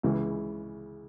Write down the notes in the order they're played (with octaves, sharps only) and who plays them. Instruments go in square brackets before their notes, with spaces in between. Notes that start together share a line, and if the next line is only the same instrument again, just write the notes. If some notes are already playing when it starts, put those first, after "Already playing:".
[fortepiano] C#2 C#3 E3 G#3